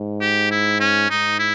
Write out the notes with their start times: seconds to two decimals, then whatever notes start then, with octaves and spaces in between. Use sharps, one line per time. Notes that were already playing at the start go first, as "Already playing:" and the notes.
Already playing: G#2
0.21 G4
0.51 E4
0.80 C#4
1.10 G#2 D#4
1.39 E4